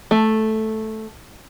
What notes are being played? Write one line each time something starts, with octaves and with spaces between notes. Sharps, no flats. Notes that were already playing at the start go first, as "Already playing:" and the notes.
A3